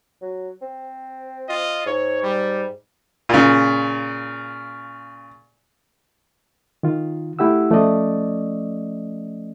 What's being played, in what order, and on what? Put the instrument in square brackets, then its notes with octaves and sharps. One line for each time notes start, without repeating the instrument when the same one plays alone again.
[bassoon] F#3
C4
[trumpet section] F4 D#5
[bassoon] G#2 [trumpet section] C#5
[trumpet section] G3
[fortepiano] A#2 C#3
[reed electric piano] D#3 F4
A3 E4 G4 F#5 E6
F3 A3 C#4 D5 D#5